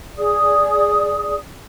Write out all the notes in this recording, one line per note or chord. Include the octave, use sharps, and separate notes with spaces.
G#4 D5 D#6